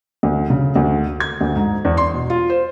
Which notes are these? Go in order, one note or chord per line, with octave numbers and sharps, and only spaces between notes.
D2
C#3
D2
G#6
D2
G#2
E2
C6
B2
F4
C5